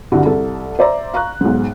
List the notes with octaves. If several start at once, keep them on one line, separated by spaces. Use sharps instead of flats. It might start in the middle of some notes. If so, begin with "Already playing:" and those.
C2 G2 D3 E4 F#4
C2 A4
C5 D5 E5 A#5
F5 A#5 C#6 F#6
B1 G#2